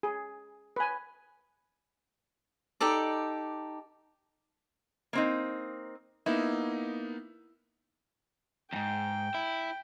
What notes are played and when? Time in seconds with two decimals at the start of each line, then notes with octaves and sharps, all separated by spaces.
0.03 G#4
0.76 B4 G#5
2.80 D#4 G4 A4 D5
5.13 A#3 C4 D#4
6.26 A#3 B3 D#4 E4
8.73 E2 G#2 G5
9.35 E4